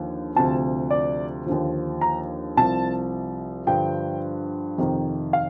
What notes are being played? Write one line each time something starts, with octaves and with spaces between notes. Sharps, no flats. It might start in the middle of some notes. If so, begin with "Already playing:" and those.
Already playing: D#2 D3 F3
D2 C3 F3 A5
D5
D#2 D3 F3
A#5
C2 C3 F3 A5
G2 D3 F3 G5
F2 C3 D#3
F5